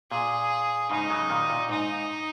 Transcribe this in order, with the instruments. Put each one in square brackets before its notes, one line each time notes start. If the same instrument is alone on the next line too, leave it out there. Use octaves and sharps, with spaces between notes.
[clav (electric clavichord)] A#2 [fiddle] G#4
[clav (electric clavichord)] G#2 C#3 [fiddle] D#4
[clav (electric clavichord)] C#3 F#3
A#2 D#3
A#2
[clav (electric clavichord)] G#2 [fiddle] D#4